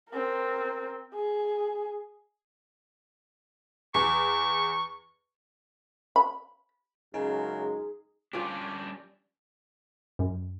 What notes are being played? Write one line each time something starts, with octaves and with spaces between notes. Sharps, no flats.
C4 A#4
G#4
E2 C#6
B5
F#2 C#3 G#3 D#4 G#4 A#4
G3 C#4 D4 F4 G4 D5
F#2